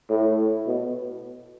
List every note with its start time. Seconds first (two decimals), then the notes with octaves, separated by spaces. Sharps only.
0.10 A2
0.66 B2